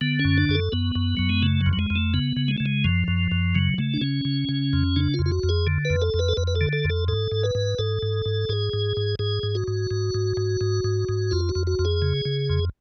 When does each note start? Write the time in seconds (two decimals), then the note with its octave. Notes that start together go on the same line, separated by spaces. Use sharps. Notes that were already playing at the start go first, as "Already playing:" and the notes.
0.01 D3 B3
0.19 C#4
0.25 F#2
0.38 D4
0.49 F#2 G#4
0.55 A4
0.72 F#2 B3
0.95 F#2
1.17 F#2 F#3
1.29 G#3
1.42 C#3 A3
1.61 F#3
1.66 F2
1.73 F#3
1.79 G#3
1.90 F2
1.96 A3
2.14 C#3 B3
2.37 C#3
2.48 G#3
2.58 C#3 A3
2.66 G#3
2.84 F#2 F3
3.08 F#2
3.32 F#2
3.55 C#3 F#3
3.78 C#3 A3
3.94 D4
4.01 C#3 C#4
4.25 C#3
4.49 C#3
4.73 F2
4.96 C#3 D4
5.14 F4
5.19 F2
5.26 F4
5.32 F#4
5.43 F2
5.49 G#4
5.67 D3
5.85 F2 B4
6.02 A4
6.14 F2
6.19 B4
6.29 A4
6.37 F2 B4
6.47 B4
6.56 A4
6.61 D3
6.73 A4
6.84 F2
6.90 A4
7.08 G#2 A4
7.32 G#2
7.43 B4
7.55 G#2
7.79 G#2 A4
8.03 G#2
8.26 G#2
8.49 G#2 G#4
8.73 G#2
8.97 G#2
9.19 G#2 G#4
9.43 G#2
9.55 F#4
9.68 G#2
9.91 G#2
10.14 G#2
10.37 G#2
10.61 G#2
10.84 G#2
11.09 G#2
11.31 F2 F4
11.49 F#4
11.55 F2
11.67 F#4
11.79 F2
11.85 G#4
12.02 C#3
12.25 C#3
12.50 F2